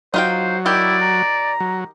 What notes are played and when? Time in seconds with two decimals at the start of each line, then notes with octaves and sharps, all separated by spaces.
0.14 F#3 D#4 F4 C5 G5
0.66 D#3 E4 G4 D5
1.02 A#5
1.60 F#3